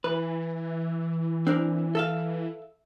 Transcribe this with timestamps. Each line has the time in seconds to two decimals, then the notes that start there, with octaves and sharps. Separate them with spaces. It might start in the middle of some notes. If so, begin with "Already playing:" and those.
0.04 E3 B4
1.47 C4 D4 A#4
1.95 A4 E5 F5